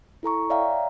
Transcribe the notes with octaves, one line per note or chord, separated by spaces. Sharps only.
E4 A4 A#5 C#6
C#5 D5 E5 F5 G5 A#5